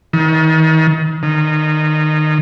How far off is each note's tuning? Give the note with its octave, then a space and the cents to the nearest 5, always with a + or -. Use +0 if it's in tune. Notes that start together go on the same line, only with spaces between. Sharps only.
D#3 +35
D#3 -20